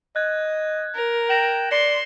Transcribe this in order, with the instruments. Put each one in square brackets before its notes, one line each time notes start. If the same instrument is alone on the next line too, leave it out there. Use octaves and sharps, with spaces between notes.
[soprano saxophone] D#5 [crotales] F#6 G#6
[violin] A#4
[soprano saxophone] G5 [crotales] A#6 E7 F#7
[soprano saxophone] D5 [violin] C6 [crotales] A#6 C#7